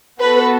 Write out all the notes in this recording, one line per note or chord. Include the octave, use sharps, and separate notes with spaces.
B3 F#4 A4 B4